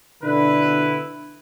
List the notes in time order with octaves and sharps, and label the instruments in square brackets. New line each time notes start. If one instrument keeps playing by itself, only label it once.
[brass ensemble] B2 D3 D4 [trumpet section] E4 B4